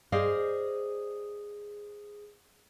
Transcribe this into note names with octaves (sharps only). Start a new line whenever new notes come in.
G#4 C5 D5 D#5 F5